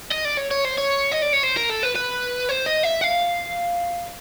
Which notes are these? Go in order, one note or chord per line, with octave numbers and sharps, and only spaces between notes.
D#5
D5
C#5
C#5
C5
C#5
D#5
D5
C#5
C5
A#4
A4
B4
B4
C5
D#5
E5
F5